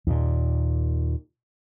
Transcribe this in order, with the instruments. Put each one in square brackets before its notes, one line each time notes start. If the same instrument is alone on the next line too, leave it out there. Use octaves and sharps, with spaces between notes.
[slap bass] D#2 A#2